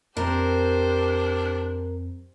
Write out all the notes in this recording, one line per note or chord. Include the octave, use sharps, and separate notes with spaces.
F2 C4 D4 G4 A#4 C5